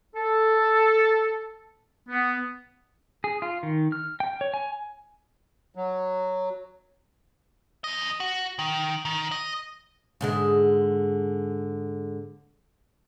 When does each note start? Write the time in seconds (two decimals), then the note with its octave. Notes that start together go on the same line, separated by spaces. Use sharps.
0.15 A4
2.09 B3
3.24 G#4
3.42 F4
3.63 D#3
3.92 F6
4.20 G5
4.41 C#5
4.54 G#5
5.75 F#3
7.84 F2 D#5
8.20 F#4
8.59 D#3
9.05 D#3
9.31 D#5
10.21 G#2 D3 G#3